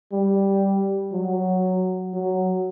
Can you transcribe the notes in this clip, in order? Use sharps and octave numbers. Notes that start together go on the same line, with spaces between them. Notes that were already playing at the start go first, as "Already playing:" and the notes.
G3
F#3
F#3